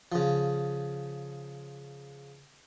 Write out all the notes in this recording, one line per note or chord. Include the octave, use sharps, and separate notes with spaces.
C#3 F3